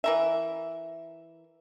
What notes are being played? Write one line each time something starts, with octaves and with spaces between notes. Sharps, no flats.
E3 A#4 E5